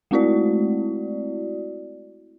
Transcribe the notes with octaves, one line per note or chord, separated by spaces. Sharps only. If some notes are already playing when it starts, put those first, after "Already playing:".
G#3 A3 C4 E4 F#4 D5